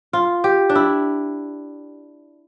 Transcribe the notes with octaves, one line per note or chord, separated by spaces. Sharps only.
F4
G4
D4
E4